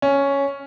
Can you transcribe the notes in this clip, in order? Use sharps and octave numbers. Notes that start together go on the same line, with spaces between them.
C#4